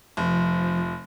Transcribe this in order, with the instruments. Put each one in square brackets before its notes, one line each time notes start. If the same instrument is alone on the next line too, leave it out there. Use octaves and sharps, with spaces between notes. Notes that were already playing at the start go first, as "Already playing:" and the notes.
[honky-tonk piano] F1 [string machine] F3